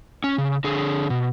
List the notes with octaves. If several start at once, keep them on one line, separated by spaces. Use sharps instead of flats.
C#4
C#3
D3 G#4
B2